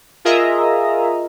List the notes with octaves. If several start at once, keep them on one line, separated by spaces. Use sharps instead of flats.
F4 G#4 A#4 D#5 E5 A#5